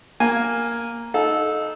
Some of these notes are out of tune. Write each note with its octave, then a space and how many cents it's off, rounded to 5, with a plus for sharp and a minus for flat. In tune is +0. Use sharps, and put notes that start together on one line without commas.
A#3 +0 G#5 -10
D#4 +0 A4 -15 F5 +40